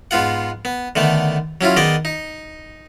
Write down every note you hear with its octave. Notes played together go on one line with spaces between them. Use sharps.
G#2 B3 F4 F#5
B3
D3 D#3 A3 B3
F#3 C#4 E4 F4
D#3 B3 G#4 D5 D#5
D#4